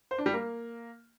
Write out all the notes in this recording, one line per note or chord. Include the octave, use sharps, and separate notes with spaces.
C5
D4
G3
A#3